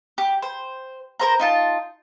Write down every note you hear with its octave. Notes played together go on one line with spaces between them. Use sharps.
G4
C5
A#4 C5 A#5
D#4 F4 A5